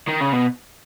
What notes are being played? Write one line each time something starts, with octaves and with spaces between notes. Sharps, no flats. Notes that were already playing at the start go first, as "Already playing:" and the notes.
D#3
C#3
B2